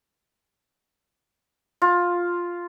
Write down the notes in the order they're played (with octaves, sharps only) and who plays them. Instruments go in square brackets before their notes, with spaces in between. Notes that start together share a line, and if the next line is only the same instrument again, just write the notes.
[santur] F4